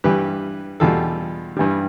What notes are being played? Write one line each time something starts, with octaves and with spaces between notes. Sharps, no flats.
G2 E3 G3 G4 B4
E2 B2 G3 F4 A4
G2 E3 G3